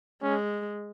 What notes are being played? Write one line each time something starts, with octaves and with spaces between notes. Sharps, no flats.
G#3 C#4